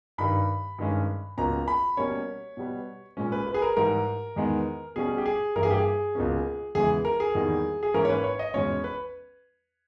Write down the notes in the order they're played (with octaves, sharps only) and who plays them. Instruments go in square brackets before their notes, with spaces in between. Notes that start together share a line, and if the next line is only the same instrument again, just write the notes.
[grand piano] G2 D#3 G3 B5
G2 D#3 G#3 C#4
C#2 B2 A#3 C#4 A#5
B5
B2 G3 A#3 C#4 C#5
B2 G3 B3
A#2 G#3 C#4
B4
B4
G#4
A#4
G#2 E3 G3 A#4
E2 D#3 G#3 B3
B2 G3 C#4 G#4
G4
G#4
G2 E3 G3 A#3 A#4
G#4
G4
G#4
C#2 B2 A#3 C#4
E2 C#3 E3 G#3 G#4
A#4
G#4
E2 D#3 G3 A#3
G#4
G#2 E3 A#3 C#4 A#4
C#5
B4
C#5
D#5
E2 B2 G#3 C#4 C#5
B4